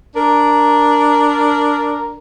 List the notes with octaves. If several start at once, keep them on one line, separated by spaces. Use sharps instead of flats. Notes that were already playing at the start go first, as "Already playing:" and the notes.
D4 A#4